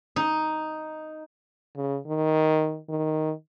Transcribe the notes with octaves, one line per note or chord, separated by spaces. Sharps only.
D#4
C#3
D#3
D#3